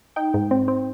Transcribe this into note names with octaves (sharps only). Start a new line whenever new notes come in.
D#4 G5
G#2
C4
C4